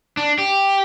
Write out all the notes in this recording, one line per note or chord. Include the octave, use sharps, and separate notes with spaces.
D4
G4